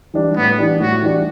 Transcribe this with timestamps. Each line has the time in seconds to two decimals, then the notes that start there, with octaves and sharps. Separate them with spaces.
0.14 E3 G3 D4
0.36 A2 B3
0.58 E3 G3 D4
0.80 A2 F#4
1.02 E3 G3 D4